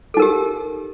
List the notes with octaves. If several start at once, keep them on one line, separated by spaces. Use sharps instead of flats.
D#4 G4 A4 A#4